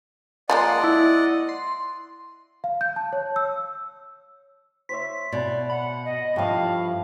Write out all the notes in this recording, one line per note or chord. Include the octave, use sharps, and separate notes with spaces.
F3 G#3 A#3 D5 D#5 F#5 C6
E4
C6
F5
G6
A5
C#5
E6
C5 C#5 E5 B6
B2 C#4 D5
F#5 B5
D#5
G2 F3 A3 G4 F5